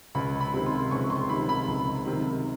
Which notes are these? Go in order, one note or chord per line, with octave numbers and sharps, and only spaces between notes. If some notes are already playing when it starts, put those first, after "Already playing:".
C#2 B5
B5
C3 D#3
C6
C#2 C#6
C6
C3 D#3 B5
B5
C#2
C3 D#3